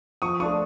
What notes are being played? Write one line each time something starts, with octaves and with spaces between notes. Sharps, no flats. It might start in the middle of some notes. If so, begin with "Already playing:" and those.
F3 C#6 D#6
A3 D4 F4 C#6 D#6